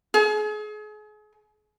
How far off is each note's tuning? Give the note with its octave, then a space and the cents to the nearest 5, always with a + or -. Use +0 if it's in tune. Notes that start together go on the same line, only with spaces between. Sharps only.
G#4 +35